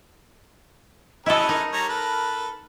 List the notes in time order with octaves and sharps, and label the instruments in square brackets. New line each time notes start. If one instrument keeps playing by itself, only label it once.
[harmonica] C#4 G#4 B4 [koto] E4 A4 [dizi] D#5
[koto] D#4 [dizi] A#4
[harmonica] G3 C#5 A#5
A4 B4